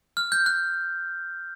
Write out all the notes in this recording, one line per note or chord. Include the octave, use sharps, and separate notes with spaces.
F6
G6
F#6